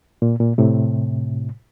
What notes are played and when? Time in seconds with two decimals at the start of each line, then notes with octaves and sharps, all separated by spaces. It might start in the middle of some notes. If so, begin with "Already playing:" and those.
0.22 A#2
0.40 A#2
0.58 A2 C3